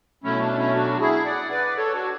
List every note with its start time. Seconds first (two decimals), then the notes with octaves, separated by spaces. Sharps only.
0.24 B2 F#3 A3 C#4 E4
0.41 D4
0.58 C#4 E4
0.75 D4 F#4
1.00 E4 G#4
1.26 D5 F#5
1.51 B4 D5
1.77 A4 C#5
1.94 D4 F#4